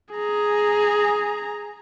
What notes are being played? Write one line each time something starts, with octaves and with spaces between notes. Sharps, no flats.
G#4 A#5